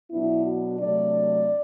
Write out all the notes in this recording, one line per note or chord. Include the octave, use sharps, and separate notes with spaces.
B2 F#3 B3 D4 E4
F#4
C3 F#3 A3 D4 D5